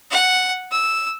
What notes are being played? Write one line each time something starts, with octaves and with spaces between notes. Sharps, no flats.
F#5
E6